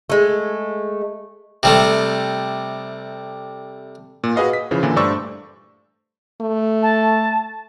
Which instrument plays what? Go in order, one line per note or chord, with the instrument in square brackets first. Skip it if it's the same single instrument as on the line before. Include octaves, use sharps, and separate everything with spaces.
[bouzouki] G#3 A3
[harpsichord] C3 G3 A3
[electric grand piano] A#2
F#4 G#4 B4 D#5 F5
B6
C#3 E3 F3
A#2 D3 E3 A4
G2 A3 C5 D5 C#6 E6
[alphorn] A3
[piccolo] A5